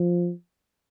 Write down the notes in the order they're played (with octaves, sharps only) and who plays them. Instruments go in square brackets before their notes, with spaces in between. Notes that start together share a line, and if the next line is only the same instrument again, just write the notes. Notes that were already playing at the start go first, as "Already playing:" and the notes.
Already playing: [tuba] F3